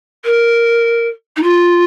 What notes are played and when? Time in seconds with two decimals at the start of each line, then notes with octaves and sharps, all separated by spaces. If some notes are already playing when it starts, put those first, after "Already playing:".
0.24 A#4
1.36 D#4
1.42 F4